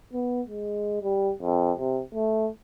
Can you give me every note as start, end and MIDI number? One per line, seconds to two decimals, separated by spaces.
0.14 0.42 59
0.48 0.98 56
1.02 1.32 55
1.42 1.72 41
1.78 2.01 48
2.14 2.49 57